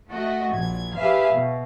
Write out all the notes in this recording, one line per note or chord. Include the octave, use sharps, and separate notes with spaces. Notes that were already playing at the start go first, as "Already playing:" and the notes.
A3 F#4 D#5
A#1 G#6
G4 G#4 B4 E5 F5
B2